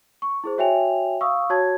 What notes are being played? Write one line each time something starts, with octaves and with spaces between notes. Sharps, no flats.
C#6
E4 G#4 C5
F#4 C#5 E5 G5 G#5 F7
F5 C#6 D#6 E6
F#4 C#5 A5 G#6